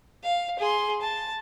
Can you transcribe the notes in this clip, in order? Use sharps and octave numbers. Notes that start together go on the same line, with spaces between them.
F5
G#4 C6
A5